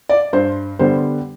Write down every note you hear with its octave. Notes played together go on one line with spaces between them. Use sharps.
D5
G2 C5
D3 G3 B3 C5